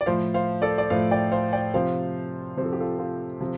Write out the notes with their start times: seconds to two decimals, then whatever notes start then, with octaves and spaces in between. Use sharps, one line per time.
0.01 D5
0.06 A2 F3 C5 F5
0.34 C5 F5
0.62 A4 D5
0.78 D5
0.90 A2 F3 C5 F5
1.11 D5 G5
1.32 C5 F5
1.53 D5 G5
1.74 C3 F3 C5 F5
2.57 C3 C5
2.61 F3 A4
2.73 G4
2.80 F4 A4
2.98 F4 A4
3.40 C3 F3